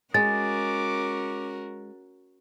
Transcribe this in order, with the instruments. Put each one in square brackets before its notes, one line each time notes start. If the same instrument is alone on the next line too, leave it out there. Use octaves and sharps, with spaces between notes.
[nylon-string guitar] G#3 [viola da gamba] C#4 F#4 A#4 [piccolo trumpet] D6 [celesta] A6